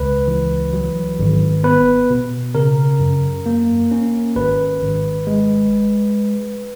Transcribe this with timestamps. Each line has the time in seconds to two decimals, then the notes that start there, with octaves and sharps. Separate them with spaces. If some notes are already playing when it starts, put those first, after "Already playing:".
Already playing: C#2 B4
0.28 E3
0.73 F#3
1.19 G#1
1.64 B3 B4
2.10 B2
2.55 C#3 A#4
3.00 F#2
3.46 A#3
3.91 C#4
4.36 G#1 B4
4.82 G#1
5.27 G#3